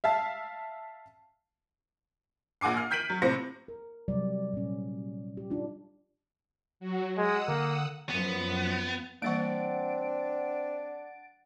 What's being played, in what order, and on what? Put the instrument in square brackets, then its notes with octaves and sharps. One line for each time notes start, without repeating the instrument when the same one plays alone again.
[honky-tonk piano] E5 F5 A5
A#1 F#5 G#5 D6 C7
F6 C7
F6 G6 B6 D7 D#7 F#7
F#3
A2 C3 C5 A#6 C#7
[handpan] A#4
C3 F#3 G3 D5
A#2 C#4
G4
D4 D#4 F4
[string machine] F#3 F#4
[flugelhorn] G#3 [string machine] F#5 D#6 E6
[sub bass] D3 [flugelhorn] A#3
[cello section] F#2 F3 [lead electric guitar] B3
[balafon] E3 G3 A#3 [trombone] C4 [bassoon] D4 [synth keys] F#5 A6 D7